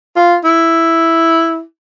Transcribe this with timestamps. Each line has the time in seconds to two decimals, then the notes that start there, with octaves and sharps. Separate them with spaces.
0.17 F4
0.45 E4